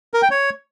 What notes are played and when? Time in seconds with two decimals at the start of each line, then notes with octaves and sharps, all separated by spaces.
0.14 A#4
0.22 G5
0.31 C#5